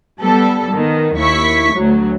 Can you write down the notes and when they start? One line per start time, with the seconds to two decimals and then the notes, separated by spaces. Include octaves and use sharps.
0.22 G3 B3 A4
0.74 D#3 B3
1.18 D#2 E4 C#6 B6
1.76 D2 F#3